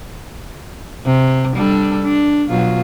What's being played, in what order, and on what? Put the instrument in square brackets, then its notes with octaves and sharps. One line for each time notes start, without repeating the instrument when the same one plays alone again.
[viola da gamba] C3
G3 D4 A4
D4
B2 F#3 F4